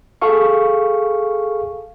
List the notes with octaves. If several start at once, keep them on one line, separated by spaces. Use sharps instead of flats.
G#4 A4 F5 C#6